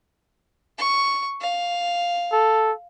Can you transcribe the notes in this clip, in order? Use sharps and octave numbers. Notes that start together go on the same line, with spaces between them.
C#6
F5
A4